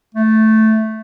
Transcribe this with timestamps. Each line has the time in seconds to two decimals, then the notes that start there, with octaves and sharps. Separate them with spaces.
0.14 A3